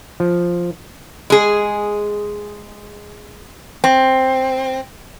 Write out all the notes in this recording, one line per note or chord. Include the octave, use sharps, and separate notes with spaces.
F3
G#3 G#4
C4